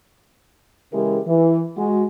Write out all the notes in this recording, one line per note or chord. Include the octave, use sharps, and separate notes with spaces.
C#3 E3 G#3 E4 G4 A#4
E3
G#3 F#4